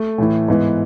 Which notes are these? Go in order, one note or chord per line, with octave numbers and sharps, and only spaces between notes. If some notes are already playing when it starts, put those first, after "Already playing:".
Already playing: A3
A2 E3
G#2 E3 B3